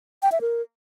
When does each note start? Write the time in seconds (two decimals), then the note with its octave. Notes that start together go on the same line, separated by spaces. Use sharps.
0.23 G5
0.32 E5
0.41 A#4